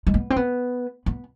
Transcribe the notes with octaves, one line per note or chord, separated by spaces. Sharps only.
G#3
B3
C4
B3
B3